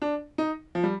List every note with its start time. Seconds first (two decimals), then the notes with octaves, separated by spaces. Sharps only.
0.02 D4
0.38 D#4
0.75 F3
0.84 G3